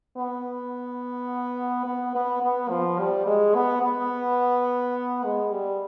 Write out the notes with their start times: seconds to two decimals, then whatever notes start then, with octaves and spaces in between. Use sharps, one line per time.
0.17 B3
1.85 B3
2.15 B3
2.43 B3
2.70 F3
2.99 G3
3.26 G#3
3.54 B3
3.83 B3
5.24 G#3
5.52 G3